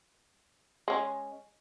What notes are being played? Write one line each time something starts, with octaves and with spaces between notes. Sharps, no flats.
G#3 C#4